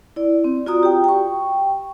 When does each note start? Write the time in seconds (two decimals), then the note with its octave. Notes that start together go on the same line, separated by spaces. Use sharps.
0.16 E4 D5
0.44 C4
0.66 F4 F#4 D5 A#5 D#6
0.83 G4 G5
1.04 G5 C#6